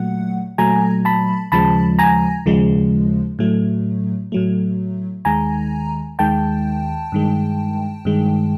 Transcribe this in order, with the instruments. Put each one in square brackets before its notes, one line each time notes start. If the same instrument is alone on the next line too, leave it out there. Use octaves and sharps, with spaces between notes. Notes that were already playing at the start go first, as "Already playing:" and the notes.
Already playing: [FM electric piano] A#2 F#3 A3 F#5
A#2 F#3 A3 G#5 A#5
A5 B5
D#2 C#3 F3 G#3 A5 B5
G#5 A#5
D#2 C#3 F3 G#3
A2 F#3 A3
A2 F#3 A3
D#2 D#3 G#3 G#5 A#5
D#2 D#3 G#3 G5 A5
G2 D#3 G#3
G2 D#3 G#3